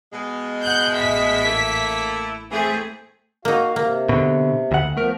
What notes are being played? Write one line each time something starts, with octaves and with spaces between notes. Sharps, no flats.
B2 G#3
F#5 F#6 G6
A1 E5 B6
A3 A#3 E4
E3 A3 C4 G#4
A#3 D#4 F#4 F5
C3 A#3
B2 D3
D2 F#5
F3 A3 B3 A#4